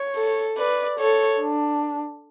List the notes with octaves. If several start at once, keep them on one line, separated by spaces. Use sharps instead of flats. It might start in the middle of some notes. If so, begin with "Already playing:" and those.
Already playing: C#5
A4
B4 D5
A4 C#5
D4